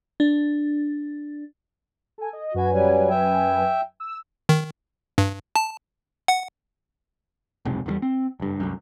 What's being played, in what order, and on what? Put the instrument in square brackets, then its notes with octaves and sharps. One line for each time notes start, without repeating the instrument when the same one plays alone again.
[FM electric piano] D4
[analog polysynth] A4 G#5
D#5
[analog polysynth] F#2 B4 G#5 [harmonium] F#4
[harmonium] F#3 G3
E5 G5
[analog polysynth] E6
[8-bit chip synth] D#3
G2
A5
F#5
[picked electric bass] F1 B1 G#2 C3
E2 D3 G3
C4
F#1 G2
C2 F#2